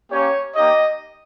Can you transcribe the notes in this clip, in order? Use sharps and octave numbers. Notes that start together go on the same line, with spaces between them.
A#3 C#4 G4 C#5
A#3 D#4 G4 D#5